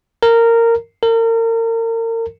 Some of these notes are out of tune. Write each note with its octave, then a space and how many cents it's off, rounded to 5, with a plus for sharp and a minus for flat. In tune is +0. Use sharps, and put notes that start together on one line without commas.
A#4 -15
A#4 -35